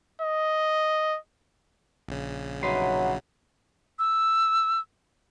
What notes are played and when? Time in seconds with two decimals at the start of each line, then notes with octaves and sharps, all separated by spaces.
0.21 D#5
2.09 A#1 C#3
2.63 C2 F#3 D#4 B4 E5 F#5 C6
3.99 E6